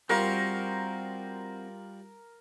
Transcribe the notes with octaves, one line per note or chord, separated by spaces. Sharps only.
G3 C4 F4 F#4 A#4 C5